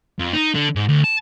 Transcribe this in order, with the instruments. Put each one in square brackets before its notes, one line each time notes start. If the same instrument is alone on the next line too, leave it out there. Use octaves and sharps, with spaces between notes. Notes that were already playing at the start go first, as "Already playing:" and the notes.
[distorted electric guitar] F2
D#4
D3
G#2
D2
A5